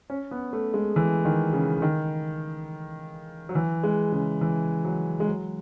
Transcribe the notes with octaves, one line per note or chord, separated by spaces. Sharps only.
C#4
B3
A3
G#3
E3
D#3
C#3
D#3
F#3
E3
G#3
C#3
E3
F#3
G#3
F#3